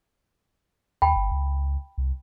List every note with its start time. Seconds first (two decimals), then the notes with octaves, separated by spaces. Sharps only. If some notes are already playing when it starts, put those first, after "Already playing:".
1.02 D#2 G5 A5 B5
1.16 G1
1.31 C#2
1.98 C2